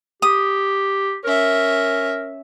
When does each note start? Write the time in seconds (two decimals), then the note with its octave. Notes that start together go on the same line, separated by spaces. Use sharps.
0.22 G4 D#6
1.24 C#4 A#4 E5